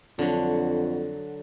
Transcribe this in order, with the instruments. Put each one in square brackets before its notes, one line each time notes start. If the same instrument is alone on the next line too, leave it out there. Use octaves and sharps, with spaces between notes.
[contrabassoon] F2 [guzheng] D3 F#3